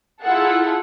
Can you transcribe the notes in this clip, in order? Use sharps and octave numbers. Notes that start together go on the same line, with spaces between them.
E4 F4 G#4 A4 F#5